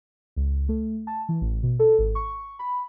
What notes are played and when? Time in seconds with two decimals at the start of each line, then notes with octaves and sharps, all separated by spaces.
0.36 C#2
0.69 A3
1.07 A5
1.29 E3
1.41 A1
1.63 B2
1.79 A4
1.99 G#1
2.15 C#6
2.59 B5